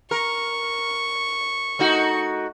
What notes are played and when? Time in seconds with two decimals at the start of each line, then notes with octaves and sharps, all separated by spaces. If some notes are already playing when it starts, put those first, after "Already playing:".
0.11 A#4 C#6
1.79 A3 D#4 F#4